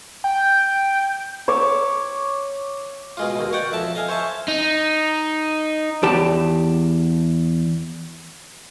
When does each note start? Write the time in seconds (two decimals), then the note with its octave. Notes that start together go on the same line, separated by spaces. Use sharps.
0.24 G5
1.48 C#5 E5 D6
3.17 B2 G#3 F4
3.35 D#2 B2
3.53 C#5 D5 F#5 G5
3.72 F2 E5 A5
3.95 D#5 F5 G#5
4.08 C5 C#5 E5 G#5 A5
4.48 D#4
6.03 E2 G4 A5